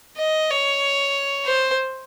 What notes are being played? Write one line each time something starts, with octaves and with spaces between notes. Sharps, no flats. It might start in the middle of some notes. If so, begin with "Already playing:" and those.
D#5
C#5
C5